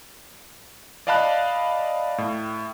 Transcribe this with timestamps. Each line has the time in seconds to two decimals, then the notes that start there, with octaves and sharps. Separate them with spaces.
1.07 D5 D#5 F5 A5 B5 F#6
2.18 A2